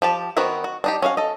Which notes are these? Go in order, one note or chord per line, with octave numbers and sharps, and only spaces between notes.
F3 G4 A5
D#3 B3 C4 F#4 A#4
F#4
D4 D#4 G4
C#4 F#4 E5 F5
A4 D#5